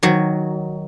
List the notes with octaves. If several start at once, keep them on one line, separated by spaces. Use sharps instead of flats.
D#3 F#3